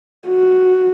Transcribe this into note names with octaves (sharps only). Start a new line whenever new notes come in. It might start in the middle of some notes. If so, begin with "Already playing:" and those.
F#4